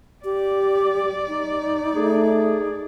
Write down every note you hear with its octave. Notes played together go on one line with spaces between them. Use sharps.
G4 D5
D#4
A3 G#4